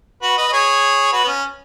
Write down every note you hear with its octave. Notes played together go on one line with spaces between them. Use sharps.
F#4 B4
B4 D#5
D#5
G#4 C#5
F#4 B4
B3
C#4